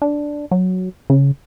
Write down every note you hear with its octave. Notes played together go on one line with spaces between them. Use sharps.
D4
F#3
C#3